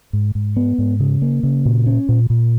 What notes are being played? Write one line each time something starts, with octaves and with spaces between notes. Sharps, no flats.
G#2
G#2
B3
G#2
C#3
A#3
C#3
A#2
C#4
A#2
A#2